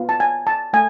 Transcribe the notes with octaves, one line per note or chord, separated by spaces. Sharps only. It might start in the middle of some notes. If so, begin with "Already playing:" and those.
Already playing: B3 F4
A5
G#5
A5
A3 G#5